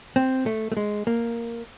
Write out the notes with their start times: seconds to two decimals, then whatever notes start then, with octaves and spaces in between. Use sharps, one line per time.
0.16 C4
0.46 A3
0.72 A3
0.77 G#3
1.07 A#3